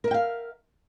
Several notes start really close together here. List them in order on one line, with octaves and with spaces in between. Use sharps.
A#4 E5 G5 F5